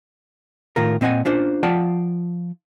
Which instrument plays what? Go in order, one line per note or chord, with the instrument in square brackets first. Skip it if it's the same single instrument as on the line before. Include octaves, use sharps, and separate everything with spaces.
[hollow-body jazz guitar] A2 D#3 F4 A#4
A#2 C4 D#5 F#5 G#5
C#4 D4 F4 C5
F3 F4 D5 F#5 G5 A5